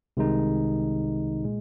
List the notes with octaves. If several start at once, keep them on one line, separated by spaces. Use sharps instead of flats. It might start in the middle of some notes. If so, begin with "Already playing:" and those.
C2 C3 D#3 G#3 D#4
A#2 G#3